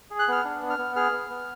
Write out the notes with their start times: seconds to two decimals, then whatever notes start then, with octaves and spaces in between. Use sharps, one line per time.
0.10 G#4
0.19 F#6
0.28 B3 F6
0.44 D4
0.62 B3
0.70 F6
0.79 B3
0.96 G#4 F6
1.12 B3
1.30 B3